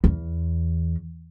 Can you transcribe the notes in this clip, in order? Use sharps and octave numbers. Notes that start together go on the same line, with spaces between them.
E2